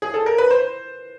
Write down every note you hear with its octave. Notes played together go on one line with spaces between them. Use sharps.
G#4
A4
A#4
B4
C5